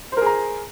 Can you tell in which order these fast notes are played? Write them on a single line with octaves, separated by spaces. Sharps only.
C5 A#4 G#4 A#5